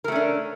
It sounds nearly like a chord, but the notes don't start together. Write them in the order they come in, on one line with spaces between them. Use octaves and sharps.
A#4 A3 C#4 D4